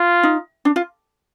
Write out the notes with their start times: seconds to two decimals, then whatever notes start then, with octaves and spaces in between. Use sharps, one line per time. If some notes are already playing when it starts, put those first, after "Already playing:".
Already playing: F4
0.23 D#4
0.65 D4
0.76 F4